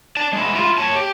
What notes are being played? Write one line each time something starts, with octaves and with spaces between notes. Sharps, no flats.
D5 A5
G#3 E4
E4 F4
C#5 A5
G4